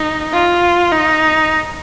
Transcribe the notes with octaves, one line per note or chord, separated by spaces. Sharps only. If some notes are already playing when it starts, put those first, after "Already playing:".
Already playing: D#4
F4
D#4